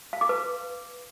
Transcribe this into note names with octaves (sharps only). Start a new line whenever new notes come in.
F5
D6
B4